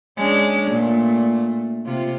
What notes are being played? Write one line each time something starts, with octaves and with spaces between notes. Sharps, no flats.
G#3 C#4 D4
A#2 A3
C3 F4